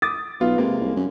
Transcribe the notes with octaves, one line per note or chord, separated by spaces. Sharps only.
D6 D#6 A6
B1 B3 F4
C3 G#3 A#3
C2
F#2